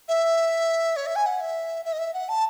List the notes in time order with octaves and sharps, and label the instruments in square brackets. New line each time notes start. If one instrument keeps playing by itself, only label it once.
[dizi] E5
C#5
E5
G#5
F#5
E5
E5
D#5
E5
F#5
A5